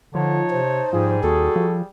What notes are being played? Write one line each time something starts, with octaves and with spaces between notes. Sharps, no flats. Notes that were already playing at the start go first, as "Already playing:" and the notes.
D3 F3 D#4 C#5 A5
C3 C5
G#2 F3 G3 G#4
D#2 F#4 A4
F3